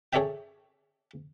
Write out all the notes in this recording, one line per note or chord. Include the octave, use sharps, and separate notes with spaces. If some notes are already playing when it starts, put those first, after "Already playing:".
G#4 A4 C#5 D5 E5 G5